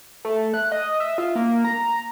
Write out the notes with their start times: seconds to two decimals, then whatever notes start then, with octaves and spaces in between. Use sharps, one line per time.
0.25 A3
0.54 F#6
0.72 D#5
1.00 E5
1.18 F4
1.35 A#3
1.64 A#5